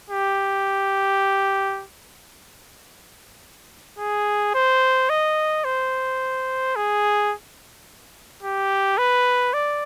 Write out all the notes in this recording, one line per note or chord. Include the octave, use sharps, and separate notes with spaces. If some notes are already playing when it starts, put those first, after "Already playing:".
G4
G#4
C5
D#5
C5
G#4
G4
B4
D5